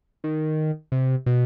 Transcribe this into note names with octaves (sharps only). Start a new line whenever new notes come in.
D#3
C3
B2